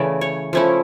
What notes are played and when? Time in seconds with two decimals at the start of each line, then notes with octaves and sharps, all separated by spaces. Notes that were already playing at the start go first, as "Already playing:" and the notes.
Already playing: C#3 E3 A3 D5
0.21 C#5
0.53 F3 A3 C#4 E4